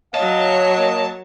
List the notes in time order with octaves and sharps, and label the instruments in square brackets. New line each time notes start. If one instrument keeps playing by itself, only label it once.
[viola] F#3 C#5 [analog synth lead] D#5 [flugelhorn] F5 [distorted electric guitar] A5
[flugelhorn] A#3